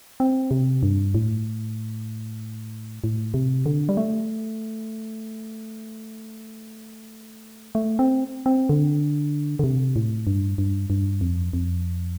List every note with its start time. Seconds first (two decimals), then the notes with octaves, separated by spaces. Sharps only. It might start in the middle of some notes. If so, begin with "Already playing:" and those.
0.20 C4
0.51 C3
0.83 G2
1.15 A2
3.04 A2
3.34 C3
3.66 D3
3.89 G3
3.97 A3
7.75 A3
7.99 C4
8.46 C4
8.69 D3
9.59 D3
9.64 C3
9.96 A2
10.27 G2
10.58 G2
10.90 G2
11.21 F2
11.53 F2